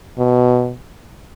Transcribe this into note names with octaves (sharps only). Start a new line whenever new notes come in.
B2